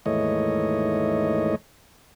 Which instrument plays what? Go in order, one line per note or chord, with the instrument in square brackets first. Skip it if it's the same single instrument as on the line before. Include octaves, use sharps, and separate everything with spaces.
[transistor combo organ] D#2 G#2 E3 A3 C#5 D#5